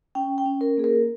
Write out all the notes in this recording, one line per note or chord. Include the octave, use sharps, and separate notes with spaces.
C#4 G5
G5
C#4
A#4
A#3 G#4
A#4